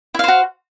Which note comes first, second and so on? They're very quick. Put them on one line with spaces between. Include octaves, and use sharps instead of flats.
E4 F5 C5 F#4